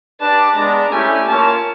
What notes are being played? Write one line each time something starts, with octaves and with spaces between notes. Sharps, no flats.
D4 G4 B4 D5 A5
G#3 B3 D4 A#5
A3 C#4 E4 G4 G#5
A#3 C#4 F4 A#4 C#5 A5